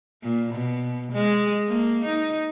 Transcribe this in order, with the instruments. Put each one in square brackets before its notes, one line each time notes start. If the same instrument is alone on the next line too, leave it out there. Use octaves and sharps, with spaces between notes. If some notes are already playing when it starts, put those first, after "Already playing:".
[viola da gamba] A#2
B2
G#3
A#3
D#4